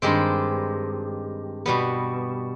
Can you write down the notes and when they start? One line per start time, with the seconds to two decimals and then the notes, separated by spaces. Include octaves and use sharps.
0.02 G2 D#3 G#3 C4 G4
1.66 B2 G3 B3